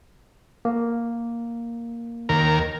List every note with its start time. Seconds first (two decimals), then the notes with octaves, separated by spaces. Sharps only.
0.65 A#3
2.29 D#2 A#4